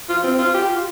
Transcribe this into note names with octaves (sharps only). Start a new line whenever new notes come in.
F4
C4
F4
G4
F4